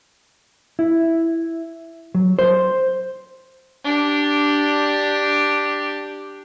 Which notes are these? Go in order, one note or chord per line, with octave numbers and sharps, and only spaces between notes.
E4
F#3
C5
D4 G4